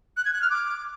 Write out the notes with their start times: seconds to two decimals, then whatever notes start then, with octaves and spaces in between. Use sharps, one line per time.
0.17 F#6
0.25 G#6
0.33 F#6
0.42 F6
0.50 D6